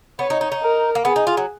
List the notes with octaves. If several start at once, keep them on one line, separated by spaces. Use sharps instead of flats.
B3 C#5
D#4
D#4
D#4
A#4
A#3
B3 G#4
D#4
F4
F#3